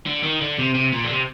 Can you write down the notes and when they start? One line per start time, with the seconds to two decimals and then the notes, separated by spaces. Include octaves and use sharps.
0.06 D3
0.23 D#3
0.41 D3
0.59 C3
0.75 C3
0.93 A#2
1.04 D3
1.10 C3